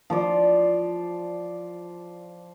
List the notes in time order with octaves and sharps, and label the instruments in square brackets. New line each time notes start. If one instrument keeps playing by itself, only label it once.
[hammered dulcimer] F3 C5 D5